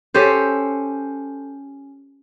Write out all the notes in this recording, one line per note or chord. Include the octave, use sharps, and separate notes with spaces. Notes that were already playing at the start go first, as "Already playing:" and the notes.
C#4 G4 A4 C5